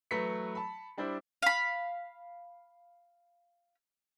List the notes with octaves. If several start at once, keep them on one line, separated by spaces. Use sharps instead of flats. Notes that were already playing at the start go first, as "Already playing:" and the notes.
E3 F#3 A3 B4 B6 C#7
A5 B5
G3 D4 E4 C5
F5 B5